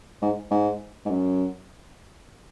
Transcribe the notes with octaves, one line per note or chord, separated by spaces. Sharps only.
G#2
G#2
G#2
F#2